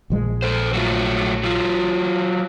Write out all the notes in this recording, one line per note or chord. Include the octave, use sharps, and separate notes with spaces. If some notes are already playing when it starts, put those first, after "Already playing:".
A#1 F3 G#3
A4 C5
F#3 A3 F4
F#3 F4